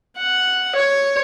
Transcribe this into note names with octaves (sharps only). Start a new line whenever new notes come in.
F#5
C#5